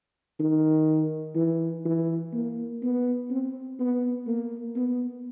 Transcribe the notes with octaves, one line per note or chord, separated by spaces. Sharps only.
D#3
E3
E3
A#3
B3
C4
B3
A#3
B3